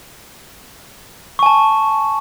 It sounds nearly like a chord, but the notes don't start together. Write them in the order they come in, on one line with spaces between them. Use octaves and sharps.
C#6 G#5 A5